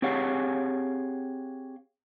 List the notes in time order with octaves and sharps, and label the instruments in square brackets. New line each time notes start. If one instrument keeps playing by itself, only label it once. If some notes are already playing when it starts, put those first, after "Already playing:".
[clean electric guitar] C4 G4 G#4 C#5 F5 F#5